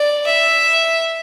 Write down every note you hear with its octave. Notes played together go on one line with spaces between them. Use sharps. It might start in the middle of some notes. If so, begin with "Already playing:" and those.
Already playing: D5
E5